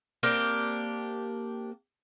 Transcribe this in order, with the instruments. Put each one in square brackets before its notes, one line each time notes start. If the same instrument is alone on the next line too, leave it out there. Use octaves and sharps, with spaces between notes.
[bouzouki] A#3 C4 D4 G4